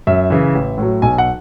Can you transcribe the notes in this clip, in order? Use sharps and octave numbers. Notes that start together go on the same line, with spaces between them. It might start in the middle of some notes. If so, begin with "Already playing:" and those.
F#2 E5
C#3 E3
A1
A2 F#3
B1 G#5
F#5